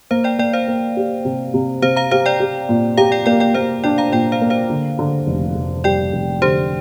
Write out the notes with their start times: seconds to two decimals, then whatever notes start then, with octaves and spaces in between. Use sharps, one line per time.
0.11 A#3 C5 F5
0.24 D5 G5
0.39 A#3 D5 G5
0.53 C5 F5
0.68 A#3
0.97 G4
1.25 C3
1.54 C3
1.82 C3 C5 F5
1.96 F5 A#5
2.11 G4 C5 F5
2.26 D5 G5
2.40 G4
2.69 A#2
2.97 G4 F5 A#5
3.12 D5 G5
3.26 A#3 D5 G5
3.40 D5 G5
3.54 A#3 C5 F5
3.84 D4 D5 G5
3.98 F5 A#5
4.12 A#2 D5 G5
4.32 C5 F5
4.41 A#3
4.50 C5 F5
4.70 D3
4.99 D3
5.27 F1
5.56 F1
5.84 G3 D5 G5
6.13 F1
6.42 D3 G4 C5